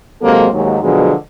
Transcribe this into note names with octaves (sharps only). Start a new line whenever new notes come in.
C3 F#3 G#3 A#3 A4 C5
D#2 G#2 F#3
B2 D3 F3 F#3 G#3